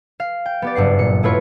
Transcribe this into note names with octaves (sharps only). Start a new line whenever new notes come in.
F5
G5
B3 G4 D5
F#1 G2 F#5 C7
A#2 C#7
F#3 A3 E4 F4 B4 C#5